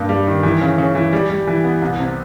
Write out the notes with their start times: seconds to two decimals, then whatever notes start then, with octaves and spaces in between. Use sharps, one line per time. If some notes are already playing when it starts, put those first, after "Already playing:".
Already playing: G2 A#3
0.09 G3
0.27 D#3
0.43 E3
0.61 C#3
0.78 C#3
0.95 E3
1.13 G3
1.30 G3
1.47 E3
1.64 B3
1.82 C2
1.99 C3